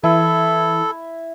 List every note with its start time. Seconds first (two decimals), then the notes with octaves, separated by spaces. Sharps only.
0.04 E3 E4 A4